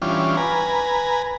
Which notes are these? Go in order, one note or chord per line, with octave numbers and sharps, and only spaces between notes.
E3 G3 C#4 D4 F4
B4 G#5 A#5